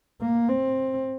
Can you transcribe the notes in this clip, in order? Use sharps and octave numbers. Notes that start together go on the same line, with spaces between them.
A#3
C4